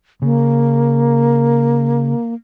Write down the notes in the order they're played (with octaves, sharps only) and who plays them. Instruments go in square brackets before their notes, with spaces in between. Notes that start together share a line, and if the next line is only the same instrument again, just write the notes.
[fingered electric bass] C#3 [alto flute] A#3